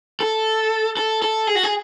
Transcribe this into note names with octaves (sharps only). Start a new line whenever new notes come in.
A4
A4
A4
G#4
F#4
G#4